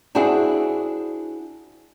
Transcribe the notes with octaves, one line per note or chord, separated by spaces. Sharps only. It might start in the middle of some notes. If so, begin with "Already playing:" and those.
C4 D4 E4 F#4 G#4